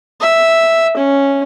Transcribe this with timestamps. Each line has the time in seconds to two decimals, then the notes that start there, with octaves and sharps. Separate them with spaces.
0.20 E5
0.97 C#4